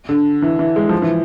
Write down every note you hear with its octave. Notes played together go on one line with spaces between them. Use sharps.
D3
E3
E3
G#3
F3
E3